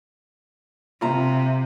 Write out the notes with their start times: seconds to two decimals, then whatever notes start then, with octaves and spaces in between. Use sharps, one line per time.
1.01 C3 F4 A#5